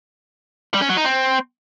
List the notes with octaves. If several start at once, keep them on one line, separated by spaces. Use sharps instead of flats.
G3
C#4
F#3
D#4
C4